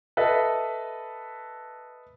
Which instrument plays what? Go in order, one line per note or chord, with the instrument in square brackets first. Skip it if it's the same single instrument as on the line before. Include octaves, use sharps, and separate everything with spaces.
[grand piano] A4 B4 D#5 E5 A5